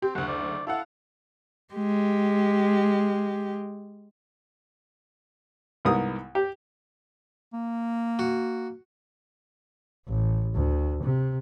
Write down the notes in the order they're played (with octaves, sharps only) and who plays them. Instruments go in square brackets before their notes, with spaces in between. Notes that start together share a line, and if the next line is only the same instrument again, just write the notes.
[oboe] C4 [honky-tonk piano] G4
[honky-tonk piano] F#1 D2 [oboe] F#5
[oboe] D5
[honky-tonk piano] E4 F5 F#5 [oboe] A4
[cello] G#3 G4
[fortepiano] C2 G#2 B3 A#4 D#6
G4
[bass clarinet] A#3
[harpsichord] F#4
[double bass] A1
D2
C3